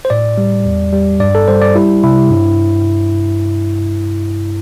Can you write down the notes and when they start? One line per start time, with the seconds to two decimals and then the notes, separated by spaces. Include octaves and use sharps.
0.05 C5
0.10 A2 D5
0.38 G3
0.66 E2
0.93 G3
1.20 G2 D5
1.35 A4
1.48 G3 C5
1.62 D5
1.75 G3 E4
2.04 C3 E4
2.31 G2